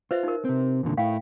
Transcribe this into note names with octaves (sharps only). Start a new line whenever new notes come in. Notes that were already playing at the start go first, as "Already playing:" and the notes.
F4 B4 C5 E5
D#4 A#4
C3 C4
E2 A#2 D3
A2 E4 F5 G5